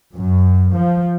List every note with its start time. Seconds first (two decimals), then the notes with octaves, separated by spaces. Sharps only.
0.15 F#2
0.74 F3